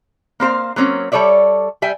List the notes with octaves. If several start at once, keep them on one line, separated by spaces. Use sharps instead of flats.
A#3 C4 C5 F5
F#3 A#3 C4 C#4
G3 A4 C#5 D5 E5
G3 E5 G5 G#5